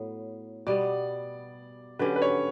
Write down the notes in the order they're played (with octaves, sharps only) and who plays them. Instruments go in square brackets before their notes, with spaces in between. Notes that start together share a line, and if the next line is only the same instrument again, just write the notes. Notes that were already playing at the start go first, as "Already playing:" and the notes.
Already playing: [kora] A2 F#3 B3
[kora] B2 G3 B3 [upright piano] D5
[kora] D3 F#3 C#4 G4 [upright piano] B4
[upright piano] B4
C#5